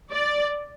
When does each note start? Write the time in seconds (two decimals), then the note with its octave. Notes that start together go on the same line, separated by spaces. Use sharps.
0.12 D5